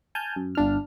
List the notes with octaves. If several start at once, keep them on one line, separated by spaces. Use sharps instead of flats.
G#5 A5 F6 G6
F#2
G1 D4 F6